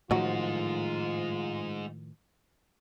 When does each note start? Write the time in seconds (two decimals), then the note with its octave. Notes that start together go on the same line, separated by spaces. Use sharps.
0.11 A2 D#3 F3 F#3 G#3 D#4 F4 F#4